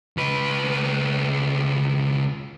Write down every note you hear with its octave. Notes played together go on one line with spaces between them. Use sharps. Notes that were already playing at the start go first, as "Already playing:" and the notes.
C#2 B4